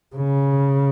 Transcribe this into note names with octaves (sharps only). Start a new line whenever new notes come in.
C#3